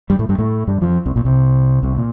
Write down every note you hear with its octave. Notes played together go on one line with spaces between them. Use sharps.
G2 G3
A2 A3
G2 G3
A2 A3
G2 G3
F2 F3
C2 C3
A#1 A#2
C2 C3
C2 C3
A#2